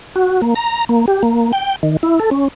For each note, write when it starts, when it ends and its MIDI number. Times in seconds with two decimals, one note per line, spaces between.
0.16 0.41 66
0.42 0.54 58
0.55 0.85 82
0.89 1.06 58
1.08 1.23 67
1.23 1.52 58
1.53 1.76 79
1.83 1.97 51
2.03 2.19 64
2.20 2.30 69
2.31 2.48 61